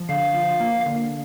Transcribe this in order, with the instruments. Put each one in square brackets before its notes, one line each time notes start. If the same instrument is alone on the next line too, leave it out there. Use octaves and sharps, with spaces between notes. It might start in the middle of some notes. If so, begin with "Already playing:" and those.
Already playing: [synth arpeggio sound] F3
[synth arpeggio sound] D3 [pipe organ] F5
[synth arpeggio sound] F3
A#3
D3